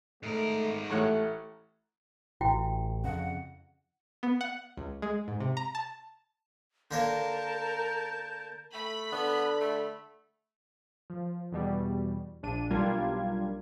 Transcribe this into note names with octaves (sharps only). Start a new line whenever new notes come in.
G#2 A3 A#4
A1 A3 C#5 F#5
A1 E4 F#4 G5
F2 C#3 F#5
B3
F#5
C#2
G#3
G#2
C3
A#5
A5
D3 A#3 A#4 C#5 A5 G6
A3 B5
D3 B3
A3
F3
E2 B2 G3
A#1 D4 D#7
B1 G3 A#3 D4 F4 G#6